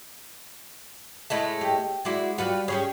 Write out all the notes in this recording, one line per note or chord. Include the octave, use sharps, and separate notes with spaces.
A2 G#3 A3
G4
G#3 E4 F#4 D5
G3 F4 F#4 B4 F5
C#4 G4 G#4 C#5